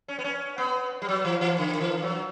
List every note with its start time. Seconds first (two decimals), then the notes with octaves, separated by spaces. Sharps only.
0.08 C#4
0.19 B3
0.24 C#4
0.58 B3
1.02 G3
1.08 F#3
1.25 E3
1.41 E3
1.58 D3
1.75 D3
1.81 E3
2.02 F#3